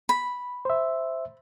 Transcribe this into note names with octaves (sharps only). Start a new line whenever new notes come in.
B5
C5 E5